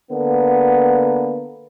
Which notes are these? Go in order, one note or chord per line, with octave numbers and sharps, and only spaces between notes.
D3 A#3 B3